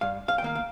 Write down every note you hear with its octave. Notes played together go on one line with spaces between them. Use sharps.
G2 F5
F5
G5
D#3 A#3 F5
F5